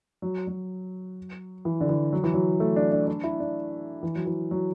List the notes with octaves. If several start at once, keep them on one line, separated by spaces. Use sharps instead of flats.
F#3
F#3
E3
D3
E3
F#3
E3
F#3
A3
D4
D4
D4
E4
D4
E3
F#3
E3
F#3